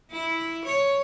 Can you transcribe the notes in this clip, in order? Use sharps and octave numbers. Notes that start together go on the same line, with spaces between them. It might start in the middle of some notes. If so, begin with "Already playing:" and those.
E4
C#5